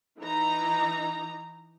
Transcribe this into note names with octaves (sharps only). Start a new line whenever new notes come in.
E3 D#4 A#5